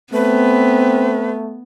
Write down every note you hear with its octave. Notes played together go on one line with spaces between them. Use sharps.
A3 B3 C4 B4